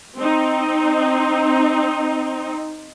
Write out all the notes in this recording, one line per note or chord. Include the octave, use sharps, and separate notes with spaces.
C4 D#4